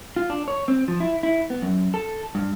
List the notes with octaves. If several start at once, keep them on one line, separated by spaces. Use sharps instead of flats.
F4
D4
C#5
C4
F3
E4
E4
B3
F#2
A4
G2